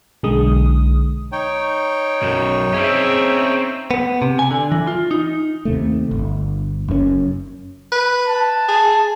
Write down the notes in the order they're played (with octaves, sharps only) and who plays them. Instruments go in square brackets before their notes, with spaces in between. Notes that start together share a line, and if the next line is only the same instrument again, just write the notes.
[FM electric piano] B1 D3 G#3 D#6
[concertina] D#4 C#5 G5
[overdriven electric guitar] B1 F#2
[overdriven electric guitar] C4 C#4 [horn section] G#4 E5
[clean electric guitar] B3
C3
G#5
D3
E3
F4
D#4
[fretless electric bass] D#2 C3 A3
G1
F#1 F#2 C#3 C#4
[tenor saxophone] B4
[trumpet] A5
[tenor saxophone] G#4